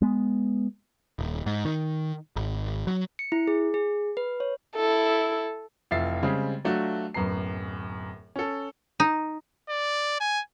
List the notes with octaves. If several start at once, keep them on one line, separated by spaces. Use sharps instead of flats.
G#3 B3
D#1
G#2
D#3
G#1
F#3
C#7
E4
G#4
G#4
B4
C#5
E4 A4
F1 E3 F4 E5 A6 C7
C#3 G3 G#3 C4
F#3 A3 D4 F4 F#4
D1 F#2 B3 A#5 C7
C#4 A4
D#4
D5
G#5